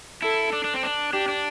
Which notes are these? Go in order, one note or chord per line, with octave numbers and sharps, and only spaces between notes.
E4 A4
D4
D4
C4
D4
D4 G4
D4